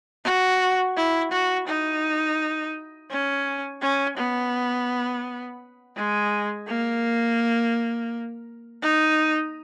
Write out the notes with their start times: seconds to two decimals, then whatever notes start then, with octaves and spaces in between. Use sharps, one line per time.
0.24 F#4
0.96 E4
1.32 F#4
1.68 D#4
3.10 C#4
3.82 C#4
4.17 B3
5.96 G#3
6.68 A#3
8.82 D#4